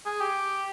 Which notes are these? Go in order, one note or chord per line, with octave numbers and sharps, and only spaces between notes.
G#4
G4